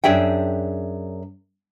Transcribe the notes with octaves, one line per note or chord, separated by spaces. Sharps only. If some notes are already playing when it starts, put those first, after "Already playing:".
F#2 D4 G#4 E5 G5